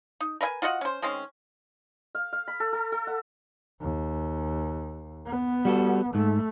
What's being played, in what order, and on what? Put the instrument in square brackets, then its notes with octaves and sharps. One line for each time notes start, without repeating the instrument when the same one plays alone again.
[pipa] D#4
A#4 B4 E5 G#5
F4 F#4 D#5 F#5
C#4 C5
D#3 G#3 C4 C#4
[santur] F5
F5
B5
A4
A4
A4
F#5
[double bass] D#2
B3
[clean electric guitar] G3 F#4 A4
[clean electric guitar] G#2 [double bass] A3